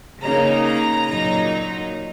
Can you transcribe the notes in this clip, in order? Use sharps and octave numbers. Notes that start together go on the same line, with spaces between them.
C#3 A#3 D#4 A#5
A#5
A#2 F#3 D#4